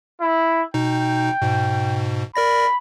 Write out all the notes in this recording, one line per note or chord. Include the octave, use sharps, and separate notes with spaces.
E4
B2 D#4 G5
G#2 B2
A#4 D5 B5 A#6